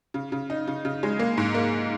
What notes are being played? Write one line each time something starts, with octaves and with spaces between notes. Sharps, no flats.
C#3
C#3
D#4
C#3
C#3
G#3
A#3
G#2
A#3